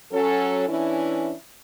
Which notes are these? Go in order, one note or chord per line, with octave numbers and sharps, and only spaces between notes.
F#3 C#4 A4
E3 C#4 D4 E4